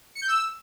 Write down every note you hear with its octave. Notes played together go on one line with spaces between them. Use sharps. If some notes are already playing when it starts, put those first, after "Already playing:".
C#7
G6
E6